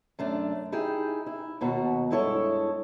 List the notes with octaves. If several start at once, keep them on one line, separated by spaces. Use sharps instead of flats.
F#2 A3 D4
D#4 E4 G4 G#4
E4
D#2 B2 F#4 A#5
G2 G#3 E4 A4 C#5